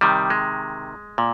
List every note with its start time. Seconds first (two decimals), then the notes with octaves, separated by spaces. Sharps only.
0.01 C3 D#3 G3
0.30 G#3
1.18 A#2